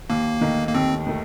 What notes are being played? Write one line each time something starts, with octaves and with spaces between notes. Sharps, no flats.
D#2 A#3
D#3 A3 D#4
A#3
D#2 C4
D#3 A3